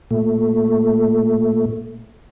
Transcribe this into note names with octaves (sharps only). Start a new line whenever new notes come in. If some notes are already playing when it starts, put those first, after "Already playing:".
A#2 A3